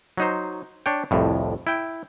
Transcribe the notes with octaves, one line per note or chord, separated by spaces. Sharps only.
F#3 D#4 C5
D4 C#5 G5
C2 F2 A2
E4 G5